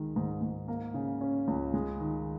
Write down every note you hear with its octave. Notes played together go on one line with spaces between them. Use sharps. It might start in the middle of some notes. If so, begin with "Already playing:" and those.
Already playing: C#2 D#3 G#3
G#2
G#2
A#3
C#3
C#4
C#2
G#3
D#3